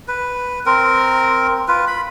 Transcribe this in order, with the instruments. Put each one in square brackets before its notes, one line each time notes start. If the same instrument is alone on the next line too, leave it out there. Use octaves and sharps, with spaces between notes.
[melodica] B4
C4 A#4
F4 B4
B5